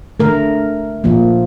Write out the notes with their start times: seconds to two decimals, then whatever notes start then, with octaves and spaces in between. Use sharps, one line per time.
0.20 D3 A3 A#4
1.04 A#2 F3 A#3